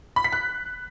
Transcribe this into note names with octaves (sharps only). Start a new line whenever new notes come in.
B5
B6
F#6